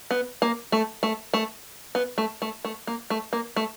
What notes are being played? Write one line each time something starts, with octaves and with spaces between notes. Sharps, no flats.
B3
A#3
A3
A3
A3
B3
A3
A3
A3
A#3
A3
A#3
A3